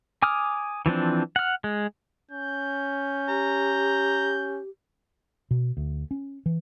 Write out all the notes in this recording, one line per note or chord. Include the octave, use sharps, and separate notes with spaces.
G#5 D6 D#6 F6
E3 F3 C4 D4
F#5 F6
G#3
C#4 G6
G4 A#5
B2
D2
C#4
E3